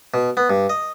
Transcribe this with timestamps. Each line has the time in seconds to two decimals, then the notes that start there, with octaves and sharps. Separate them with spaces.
0.14 B2
0.37 B3
0.50 G2
0.70 D#5